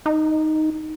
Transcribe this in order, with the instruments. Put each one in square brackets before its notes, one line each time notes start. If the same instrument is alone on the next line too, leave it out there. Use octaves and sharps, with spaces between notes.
[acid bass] D#4